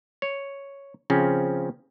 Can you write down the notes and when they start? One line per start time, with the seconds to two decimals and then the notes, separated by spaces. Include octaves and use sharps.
0.22 C#5
1.10 C#3 F3 C4 C#4